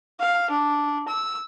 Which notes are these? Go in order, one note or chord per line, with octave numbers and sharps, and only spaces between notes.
F5
D4
E6